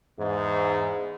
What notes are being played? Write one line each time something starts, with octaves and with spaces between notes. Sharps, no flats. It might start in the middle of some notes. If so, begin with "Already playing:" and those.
E2 G#2